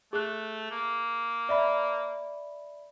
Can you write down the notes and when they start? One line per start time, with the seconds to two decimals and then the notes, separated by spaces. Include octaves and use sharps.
0.13 A3 G#4 F#6
0.71 A#3
1.49 D5 E5 B5